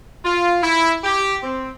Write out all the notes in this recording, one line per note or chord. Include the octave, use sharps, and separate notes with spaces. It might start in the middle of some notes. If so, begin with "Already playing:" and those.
F4
E4
G4
C4